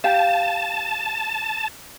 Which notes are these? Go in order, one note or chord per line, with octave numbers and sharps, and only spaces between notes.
G4 F5 A5